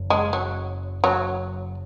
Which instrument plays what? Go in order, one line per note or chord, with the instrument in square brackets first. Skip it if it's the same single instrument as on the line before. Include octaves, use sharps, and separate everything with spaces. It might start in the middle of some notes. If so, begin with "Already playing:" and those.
Already playing: [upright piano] F#1
[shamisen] G#3
F#3
F#3